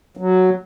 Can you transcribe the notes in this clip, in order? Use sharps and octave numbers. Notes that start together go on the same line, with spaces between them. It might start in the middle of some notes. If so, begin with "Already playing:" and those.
F#3